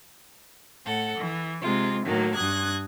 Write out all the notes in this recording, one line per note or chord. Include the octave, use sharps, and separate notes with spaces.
A2 A4 F#5
E3
C3 G#3 F4
A2 D#3 F#3 A#3
G2 D#6 F#6 G#6